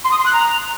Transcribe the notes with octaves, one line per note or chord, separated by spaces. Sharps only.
C6
D#6
C6
F#6
A#5